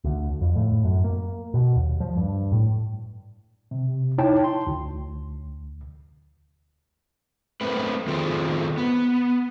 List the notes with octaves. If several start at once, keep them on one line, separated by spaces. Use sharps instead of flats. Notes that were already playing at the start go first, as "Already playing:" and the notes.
D2
F2
A2
F#2
A#3
B2
D#2
F3
G2
A2
C3
D#4 E4 C#5 G5 A5
C6
D2
A3 A#3 C4 B4
D#3 C4 F4 G#4 A4 C5
B3